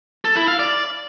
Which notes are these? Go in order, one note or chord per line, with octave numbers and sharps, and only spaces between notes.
A4
E4
F5
D5